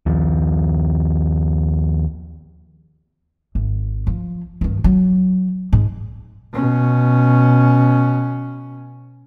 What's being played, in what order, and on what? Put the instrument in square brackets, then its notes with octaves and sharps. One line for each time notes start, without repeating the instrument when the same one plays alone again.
[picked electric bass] D#2 F3
[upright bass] G#1
F3
G2 D#3
F#3
G#2
[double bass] B2 C#4